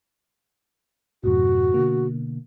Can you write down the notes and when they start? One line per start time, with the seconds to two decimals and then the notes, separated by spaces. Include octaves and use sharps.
1.24 F2 G#2 B2 F#4
1.74 B2 D3 A#3